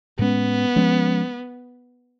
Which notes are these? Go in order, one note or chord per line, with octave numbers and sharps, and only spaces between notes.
A2 G#3 B3 C#4
F3 G#3 C#4